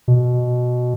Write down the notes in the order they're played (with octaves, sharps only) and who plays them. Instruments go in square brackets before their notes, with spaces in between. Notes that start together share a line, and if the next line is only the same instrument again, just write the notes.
[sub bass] B2